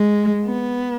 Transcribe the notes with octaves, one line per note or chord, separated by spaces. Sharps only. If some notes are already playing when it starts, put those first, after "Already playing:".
Already playing: G#3
B3